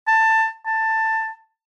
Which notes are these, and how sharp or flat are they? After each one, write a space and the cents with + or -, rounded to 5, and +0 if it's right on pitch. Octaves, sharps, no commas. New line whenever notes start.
A5 +15
A5 +15